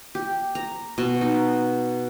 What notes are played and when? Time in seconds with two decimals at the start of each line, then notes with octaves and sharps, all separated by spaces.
0.15 G4
0.55 A#5
0.98 B2
1.21 D#4